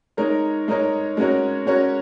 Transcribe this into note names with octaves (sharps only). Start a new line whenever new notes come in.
G#3 D#4 A#4 C#5
G#3 D#4 A#4 C#5
G#3 C#4 F#4 A#4 C#5
G#3 C#4 F#4 A#4 C#5